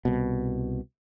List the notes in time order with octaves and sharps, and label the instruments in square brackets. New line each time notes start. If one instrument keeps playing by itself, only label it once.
[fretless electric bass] C2 B2